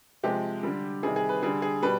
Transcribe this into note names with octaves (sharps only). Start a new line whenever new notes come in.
C3 F3 G#3 G4
D3 G3
C3 D#3 G3 G#4
G#4
B4
D3 G3 G#4
G#4
B2 G3 B4